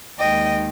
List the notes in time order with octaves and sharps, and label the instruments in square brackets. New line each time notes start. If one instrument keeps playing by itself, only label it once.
[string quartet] D#2 D#3 G#3 D#5 G5